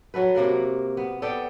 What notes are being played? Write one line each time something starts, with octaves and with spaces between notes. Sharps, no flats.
F#3 F#4 A4 B4
C3 A#3 A#4 F#5
B3
B3 A4 D5 G5